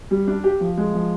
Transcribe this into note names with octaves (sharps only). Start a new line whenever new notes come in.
G3
D4
G4
F3
G#3
F3